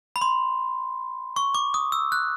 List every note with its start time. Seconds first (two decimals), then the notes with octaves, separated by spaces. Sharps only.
0.16 B5
0.21 C6
1.36 C#6
1.55 D6
1.74 D#6
1.92 E6
2.12 F#6